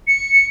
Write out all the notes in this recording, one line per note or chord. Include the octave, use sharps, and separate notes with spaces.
C#7